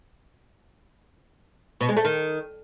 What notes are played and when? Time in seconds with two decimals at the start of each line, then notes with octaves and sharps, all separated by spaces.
1.81 B2
1.89 G#3
1.97 A3
2.05 D#3